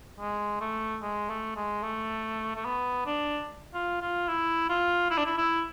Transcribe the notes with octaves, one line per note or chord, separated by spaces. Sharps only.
G#3
A3
G#3
A3
G#3
A3
A3
B3
D4
F4
F4
E4
F4
E4
D4
E4
E4